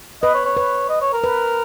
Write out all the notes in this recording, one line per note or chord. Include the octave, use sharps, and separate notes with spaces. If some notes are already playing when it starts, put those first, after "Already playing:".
B4 D#5
C#5
C#5
B4
D#5
C#5
A#4
B4